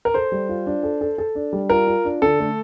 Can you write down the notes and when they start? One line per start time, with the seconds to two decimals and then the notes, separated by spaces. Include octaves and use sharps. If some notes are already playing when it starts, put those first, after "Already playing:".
0.05 A#4
0.14 A4 C5
0.32 G3
0.49 F4
0.66 D4
0.83 A4
1.01 A4
1.18 A4
1.35 D4
1.53 G3
1.70 F4 A#4
1.87 F4
2.05 D4
2.22 D3 A4
2.40 A3